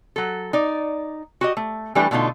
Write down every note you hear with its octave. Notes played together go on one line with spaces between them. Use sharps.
F#3 A4
D#4 D5
F#4 G4 D#5
A3
E3 G3 A3 D4 G4 B4
B2 D3 A3 D4 D#4 F4